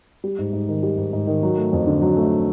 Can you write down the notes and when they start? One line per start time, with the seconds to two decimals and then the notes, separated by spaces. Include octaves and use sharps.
0.24 G3
0.38 G#2
0.53 G#2
0.68 D#3
0.83 G3
0.98 G#2
1.13 G#2
1.27 D#3
1.43 F#3
1.57 A3
1.73 F2
1.87 D3
2.02 F#3
2.16 A3